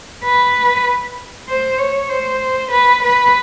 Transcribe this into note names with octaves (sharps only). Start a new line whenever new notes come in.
B4
C5
C#5
C5
B4
B4